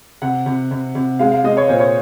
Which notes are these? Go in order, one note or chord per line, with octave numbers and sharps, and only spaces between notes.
C3 F#5
C3
C3
C3
G#3 F5
F5
G#3 D#5
C#5
A#2 C5
C#5